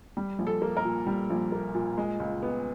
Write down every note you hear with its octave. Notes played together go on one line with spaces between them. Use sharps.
G3
A#1
A4
A#3
A#4
A#2
G3
A#1
A#3
A#2
G#3
C#2
B3